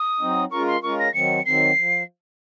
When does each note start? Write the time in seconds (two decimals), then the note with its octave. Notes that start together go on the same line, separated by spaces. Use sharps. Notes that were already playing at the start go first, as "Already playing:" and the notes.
Already playing: D#6
0.20 F#3 C4 D#4
0.51 G#3 C#4 F4 A#4 C#6
0.67 C6
0.83 G#3 C#4 F4 A#4 C#6
0.99 A#6
1.14 D#3 F#3 C4 C#7
1.46 D#3 F#3 C4 C7
1.78 F3